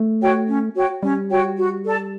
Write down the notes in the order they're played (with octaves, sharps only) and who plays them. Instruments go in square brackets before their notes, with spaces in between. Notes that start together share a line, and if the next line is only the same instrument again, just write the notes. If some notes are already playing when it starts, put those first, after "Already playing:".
Already playing: [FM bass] A3
[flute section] F#4 C#5 G5
C#4
F#4 C#5 G5
[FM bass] G3 [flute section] C#4
[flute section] F#4 C#5 G5
F#4
A4 D5 A5